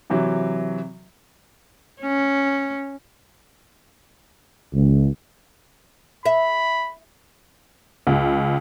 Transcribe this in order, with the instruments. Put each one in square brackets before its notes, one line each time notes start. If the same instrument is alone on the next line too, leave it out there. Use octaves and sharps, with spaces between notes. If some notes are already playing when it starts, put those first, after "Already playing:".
[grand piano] C3 E3 F#3
[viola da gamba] C#4
[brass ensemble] C#2
[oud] E5 [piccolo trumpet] B5
[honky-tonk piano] C#2